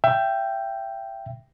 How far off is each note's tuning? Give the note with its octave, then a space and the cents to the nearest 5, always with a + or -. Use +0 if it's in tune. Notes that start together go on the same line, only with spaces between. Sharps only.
E5 +30 G5 +0